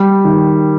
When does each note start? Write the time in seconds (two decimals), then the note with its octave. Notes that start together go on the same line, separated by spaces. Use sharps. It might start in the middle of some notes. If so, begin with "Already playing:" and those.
Already playing: G3
0.25 D#3